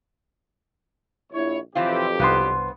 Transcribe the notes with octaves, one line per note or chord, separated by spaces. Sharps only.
A#1 E4 C#5
B1 F2 E3 C4 F4 G4
C2 G2 B3 C5 C6